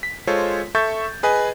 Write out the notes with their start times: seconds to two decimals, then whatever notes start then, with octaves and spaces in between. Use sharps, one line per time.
0.03 B6
0.27 G#3 F4 A4 C5 C#5
0.75 A4 E5 C#6 G6 A6
1.23 G#4 B4 D#5 G#5